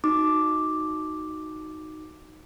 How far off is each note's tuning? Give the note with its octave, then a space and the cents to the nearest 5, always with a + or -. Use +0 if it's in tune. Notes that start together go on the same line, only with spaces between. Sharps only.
D#4 +0 F#4 +0 D6 +0